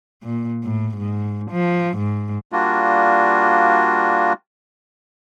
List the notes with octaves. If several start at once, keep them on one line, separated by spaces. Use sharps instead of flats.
A#2
A2
G#2
F3
G#2
G3 A#3 D4 F4 F#4